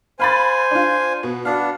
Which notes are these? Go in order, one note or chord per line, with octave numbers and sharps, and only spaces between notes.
C5 F5 G#5 B5 A6
D4 F4
B2
B3 D4 F#4 F5